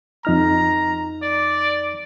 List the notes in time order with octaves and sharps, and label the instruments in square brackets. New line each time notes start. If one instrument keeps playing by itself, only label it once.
[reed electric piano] F2 D#4 F6 [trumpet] A#5
[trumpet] D5